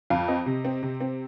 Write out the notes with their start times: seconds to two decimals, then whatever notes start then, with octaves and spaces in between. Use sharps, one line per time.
0.10 F2 F5
0.28 C4 D#5
0.46 C3
0.65 C4
0.83 C3
1.00 C4